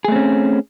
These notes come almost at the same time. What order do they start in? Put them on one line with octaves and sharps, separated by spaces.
G#4 A3 C4 C#4